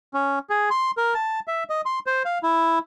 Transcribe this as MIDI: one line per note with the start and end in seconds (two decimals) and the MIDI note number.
0.14 0.39 61
0.50 0.69 68
0.70 0.91 84
0.98 1.14 70
1.14 1.40 81
1.48 1.64 76
1.70 1.81 75
1.86 1.99 84
2.06 2.23 72
2.25 2.39 77
2.43 2.79 64